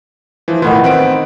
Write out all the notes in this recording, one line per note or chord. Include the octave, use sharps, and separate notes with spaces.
E3 F3
A2 D#3 E3 B3 F4
C4 B4 D7